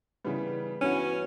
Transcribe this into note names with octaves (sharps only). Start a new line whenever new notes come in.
C#3 E3 G3 B3
G2 E3 B3 C#4 F#4